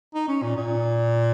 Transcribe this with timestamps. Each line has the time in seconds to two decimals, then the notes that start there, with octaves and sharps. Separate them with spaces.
0.14 D#4
0.28 C#4
0.43 A#2
0.57 A#2